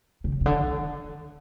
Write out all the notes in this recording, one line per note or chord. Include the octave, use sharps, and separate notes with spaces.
C#3
C#3
D3
D#3